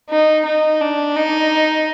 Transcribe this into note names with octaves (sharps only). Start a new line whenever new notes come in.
D#4
D#4
D4
D#4